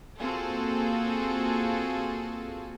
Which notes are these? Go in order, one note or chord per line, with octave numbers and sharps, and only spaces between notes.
A#3 C4 F4 F#4 G#4 A4